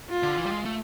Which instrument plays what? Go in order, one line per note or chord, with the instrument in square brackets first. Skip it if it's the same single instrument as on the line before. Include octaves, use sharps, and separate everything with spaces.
[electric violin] F4
[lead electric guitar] D3
E3
G3
G#3
A3